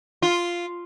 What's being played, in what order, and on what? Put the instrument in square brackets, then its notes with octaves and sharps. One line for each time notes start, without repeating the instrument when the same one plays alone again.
[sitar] F4